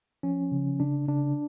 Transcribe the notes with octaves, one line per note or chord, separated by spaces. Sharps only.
F3 C#4
C#3
C#3 D4
C#3 D4